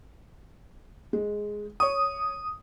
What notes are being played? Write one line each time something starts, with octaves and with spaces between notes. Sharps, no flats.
G#3
C#5 C#6 D#6